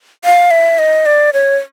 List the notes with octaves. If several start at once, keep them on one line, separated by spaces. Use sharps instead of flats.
F5
E5
D#5
D5
C#5